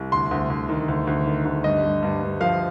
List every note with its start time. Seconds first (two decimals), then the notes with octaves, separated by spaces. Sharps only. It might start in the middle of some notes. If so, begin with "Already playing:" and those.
Already playing: C2
0.12 D2 C6
0.31 D2
0.50 D2
0.69 D#3
0.88 D2
1.07 D2
1.26 D#3
1.45 D2
1.64 G2 D#5
1.83 G2
2.03 G2
2.22 G2
2.41 F3 F5